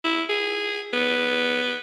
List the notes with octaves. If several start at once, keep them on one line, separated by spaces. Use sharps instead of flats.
E4
G#4
B3